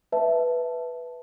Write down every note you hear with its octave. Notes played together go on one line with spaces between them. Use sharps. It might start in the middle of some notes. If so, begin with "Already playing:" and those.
B4 E5 A5